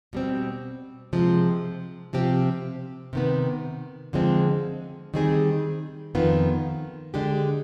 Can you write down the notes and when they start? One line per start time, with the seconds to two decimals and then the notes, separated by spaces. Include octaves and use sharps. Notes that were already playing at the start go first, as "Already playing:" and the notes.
0.13 B2 G3 C4
1.13 C3 F3 G#3
2.13 C3 F3 C4 G4
3.13 C3 D#3 B3
4.13 D3 F3 G#3 C4
5.14 D#3 G3 C4 D#4 G#4
6.15 F2 D#3 B3 F4
7.14 D3 G#3 D4 G4